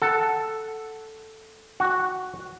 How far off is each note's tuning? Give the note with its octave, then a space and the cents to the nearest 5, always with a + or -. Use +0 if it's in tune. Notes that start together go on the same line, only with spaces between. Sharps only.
A4 +0 F#5 +0
F#4 -5 F#5 +0